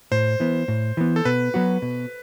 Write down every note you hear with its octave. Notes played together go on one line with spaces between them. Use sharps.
A2 C5
E3 B3
A2
E3 B3
A4
B2 B4
F#3 B3 F#4
B2